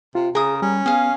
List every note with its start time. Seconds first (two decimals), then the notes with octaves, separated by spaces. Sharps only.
0.15 C3 F4
0.35 C#3 G#4 A#4 D#6
0.62 G3 C#4
0.86 B3 G#4 F5